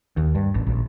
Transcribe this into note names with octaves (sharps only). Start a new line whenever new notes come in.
D#2
G2
A1
A#1